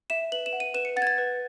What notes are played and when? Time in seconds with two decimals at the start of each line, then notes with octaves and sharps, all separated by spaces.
0.10 E5 E7
0.32 B4 F#7
0.46 E7
0.53 F#5
0.60 D#7
0.74 B4 E7
0.85 C#7
0.96 F#5 A6
1.02 G#6
1.07 A6
1.18 B4